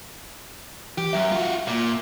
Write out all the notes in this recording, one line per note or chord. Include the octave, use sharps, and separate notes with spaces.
E3 G4
F#2 E5
F4 F#4
A#2